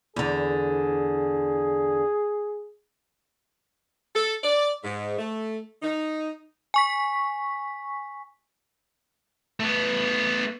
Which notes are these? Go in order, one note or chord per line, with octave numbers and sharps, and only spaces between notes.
E2 D3 G#4
A4
D5
G#2
A3
D#4
G#5 C#6 B6
A3 B3